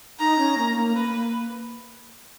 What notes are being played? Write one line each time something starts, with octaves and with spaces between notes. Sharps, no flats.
D#4 A#5
C#4
A#3
A#3
A#3 B4
A#3